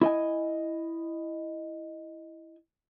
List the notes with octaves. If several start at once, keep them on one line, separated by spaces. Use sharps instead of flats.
E4 D#5 G#5